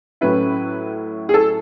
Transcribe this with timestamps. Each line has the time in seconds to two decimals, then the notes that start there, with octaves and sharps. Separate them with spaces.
0.21 A2 F#3 C#4 E4 B4
1.29 G#4
1.34 A4